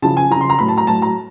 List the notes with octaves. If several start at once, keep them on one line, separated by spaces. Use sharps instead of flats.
C#3 F3 A5
G#5
F3 A#5
C#3 C6
A#5
A2 F#3 B5
A5
A#5
A2 F#3 A5
A#5